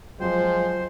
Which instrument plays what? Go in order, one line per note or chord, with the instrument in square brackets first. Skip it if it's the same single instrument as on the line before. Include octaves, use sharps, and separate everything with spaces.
[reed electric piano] F2 F#3 G5 [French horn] F3 [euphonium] G#3 [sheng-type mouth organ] C5